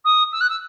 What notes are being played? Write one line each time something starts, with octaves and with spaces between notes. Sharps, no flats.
D#6
E6
F#6
E6